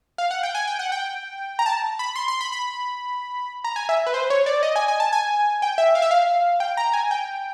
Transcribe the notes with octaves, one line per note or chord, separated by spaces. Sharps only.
F5
F#5
G5
G#5
G5
F#5
G5
A#5
A5
B5
C6
C6
B5
B5
A#5
G#5
E5
B4
C5
C#5
D5
D#5
G#5
G#5
A5
G#5
G5
E5
F5
E5
F5
G5
A#5
G#5
G5